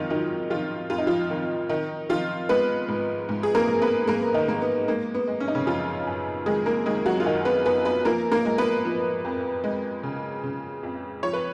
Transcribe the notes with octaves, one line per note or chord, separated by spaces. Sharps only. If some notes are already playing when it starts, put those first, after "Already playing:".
Already playing: F2 D#3 F3 G#3 D#4 F4
D#3 F#3 D#4
D#3 F3 F4
F2 F4
D#4
F3 F4
D#3
D#3 D#4
D#3 F3 F4
G#3 B3 B4
G#2
G#2
G#4
A#3 A#4
G#2
B3 B4
G#2 A#3 A#4
D#3 D#4
G#2 A#3
B3
G#3 A#3
B3
G#3
C#4
D#4
C#3 C#4
F#2 F3 F4
F#2
D#3 G#3 G#4
A#3 A#4
D#3 G#3 G#4
F#3 F#4
F4
F#2 D#3 D#4
B3 B4
F#2 B3 B4
B3 B4
F3 A#3 A#4
A#3 A#4
G#3
B3 B4
F3
F2
G#3
C#3
C#3
F2
F3 C#5
B4